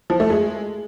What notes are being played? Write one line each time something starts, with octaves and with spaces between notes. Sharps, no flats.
F3
A3
G#3